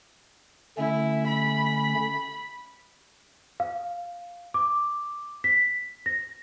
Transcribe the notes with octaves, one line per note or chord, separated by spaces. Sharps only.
D3 A3 C#4 E4
B5
F5
D6
B6
A#6